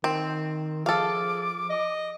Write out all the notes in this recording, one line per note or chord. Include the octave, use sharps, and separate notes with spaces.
D#3 C4
F3 G#4 A4 F5 D6
D#5